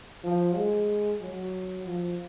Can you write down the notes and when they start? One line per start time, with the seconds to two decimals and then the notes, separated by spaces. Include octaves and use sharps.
0.24 F3
0.56 G#3
1.21 F#3
1.86 F3